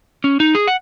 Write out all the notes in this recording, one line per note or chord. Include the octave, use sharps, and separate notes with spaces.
C#4
D#4
G#4
F#5